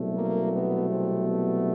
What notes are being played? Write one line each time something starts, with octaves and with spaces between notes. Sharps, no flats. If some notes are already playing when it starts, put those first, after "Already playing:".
Already playing: C2 B2 F#3 A3
A#3
B3
C4
B3